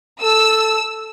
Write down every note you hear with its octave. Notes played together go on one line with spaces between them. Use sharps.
A4 E6